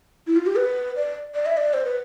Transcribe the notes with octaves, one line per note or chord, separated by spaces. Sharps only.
E4
F4
G4
B4
D5
D5
E5
D5
C5
B4